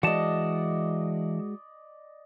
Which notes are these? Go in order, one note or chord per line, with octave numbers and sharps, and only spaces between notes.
E3 G#3 F#4 D5 D#5 A5